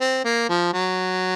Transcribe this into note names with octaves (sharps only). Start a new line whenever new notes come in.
C4
A#3
F3
F#3